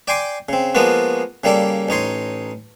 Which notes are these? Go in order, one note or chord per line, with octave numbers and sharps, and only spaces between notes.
D5 G5 G#5 C6 D6
C#3 C4
F3 G#3 A#3 B3 F4 F#4
C#3 G3 A#3 A4 D5
A1 D#4 C#5 C6